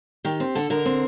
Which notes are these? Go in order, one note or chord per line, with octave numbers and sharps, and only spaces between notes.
D#3 G4
C4
D3 A4
D3 A#4
C4